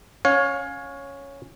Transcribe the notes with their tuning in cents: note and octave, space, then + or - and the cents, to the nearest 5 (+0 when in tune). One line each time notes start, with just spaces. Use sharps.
C#4 +0 C#5 +0 F5 +30